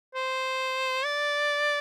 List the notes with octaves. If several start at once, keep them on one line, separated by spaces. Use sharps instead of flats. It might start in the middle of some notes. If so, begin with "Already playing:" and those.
C5
D5